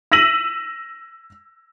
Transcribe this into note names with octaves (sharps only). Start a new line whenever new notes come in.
E6 A#6 B6 D#7 E7 F#7